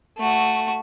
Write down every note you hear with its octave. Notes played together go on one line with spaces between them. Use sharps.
A3 F#4